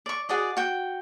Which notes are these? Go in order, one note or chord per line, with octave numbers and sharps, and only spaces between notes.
D5 C#6
F#4 G#4 D5 D#5
F#4 G5